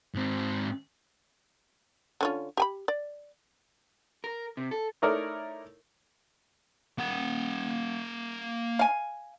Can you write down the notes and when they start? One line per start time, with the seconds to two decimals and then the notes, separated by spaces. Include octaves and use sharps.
0.14 G#2 C4
2.21 D3 C#4 F4
2.57 G4 G#5 B5
2.88 D5
4.24 A#4
4.57 C3
4.71 A4
5.02 A3 D#4 E4 A#4 C#5 D5
6.98 A#3 F#5
8.79 F5 G#5